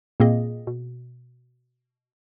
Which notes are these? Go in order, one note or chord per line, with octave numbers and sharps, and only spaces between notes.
A#2 A#3 C4 G#4 D#5
B2